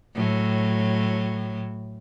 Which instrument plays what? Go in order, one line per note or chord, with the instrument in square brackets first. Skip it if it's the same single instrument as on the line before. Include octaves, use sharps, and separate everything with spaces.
[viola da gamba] A2 F#3